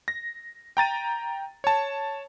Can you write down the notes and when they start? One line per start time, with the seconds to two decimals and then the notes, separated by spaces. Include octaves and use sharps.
0.08 A#6
0.77 G5 A#5 A6 D#7
1.64 C#5 A5